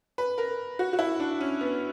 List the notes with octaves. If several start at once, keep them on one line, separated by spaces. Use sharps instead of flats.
B4
A#4
F#4
F#4
E4
D4
C#4
B3